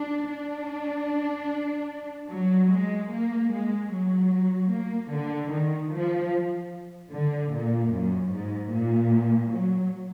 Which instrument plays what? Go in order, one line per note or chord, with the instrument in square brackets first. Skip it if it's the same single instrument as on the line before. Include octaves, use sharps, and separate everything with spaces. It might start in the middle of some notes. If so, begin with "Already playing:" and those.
Already playing: [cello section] D4
D4
F#3
G#3
A#3
G#3
F#3
A#3
D3
D#3
F3
D3
A#2
F#2
G#2
A#2
F#3